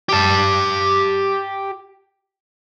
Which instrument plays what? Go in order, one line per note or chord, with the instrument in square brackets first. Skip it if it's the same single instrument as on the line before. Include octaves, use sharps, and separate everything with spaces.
[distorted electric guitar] G4 A5